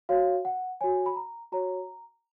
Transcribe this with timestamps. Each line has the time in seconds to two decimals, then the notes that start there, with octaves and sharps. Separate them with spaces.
0.09 F#4 C#5 F5
0.45 F#5
0.81 F#4 C#5 G#5
1.06 B5
1.16 A#5
1.52 F#4 C#5 A#5